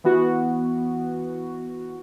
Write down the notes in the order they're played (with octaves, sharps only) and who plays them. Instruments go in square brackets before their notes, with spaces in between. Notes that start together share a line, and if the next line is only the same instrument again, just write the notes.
[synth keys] E3 B3 F#4